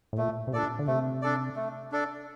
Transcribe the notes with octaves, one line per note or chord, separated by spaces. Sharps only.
A2
A#2 A3
C3
A#2 D4 A4 D5
D3
C3 A3
D4 A4 D5
A3
D4 A4 D5